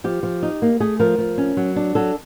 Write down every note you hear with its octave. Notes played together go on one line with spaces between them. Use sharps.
F3 G4
F3
D#4
A#3
A3 G#4
F3 A#4
F3
C#4
F#3
D4
F#3 A4